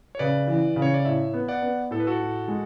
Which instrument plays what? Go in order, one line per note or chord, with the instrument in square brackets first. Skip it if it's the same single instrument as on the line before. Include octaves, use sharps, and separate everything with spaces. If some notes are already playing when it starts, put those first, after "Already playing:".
[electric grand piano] C#5
[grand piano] C#3 [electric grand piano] B4 D5
[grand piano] E3
C#3
[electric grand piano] C#5
D5
[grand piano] A2 [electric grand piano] C#5 E5
[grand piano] B3
[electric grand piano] D5 F#5
[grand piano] B3
[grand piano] A2 [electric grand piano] A4
[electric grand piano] B4
F#4 A4
[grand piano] A2
G#3